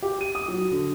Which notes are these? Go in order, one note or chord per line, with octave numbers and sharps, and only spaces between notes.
G4
D#7
D#6
F#3
D3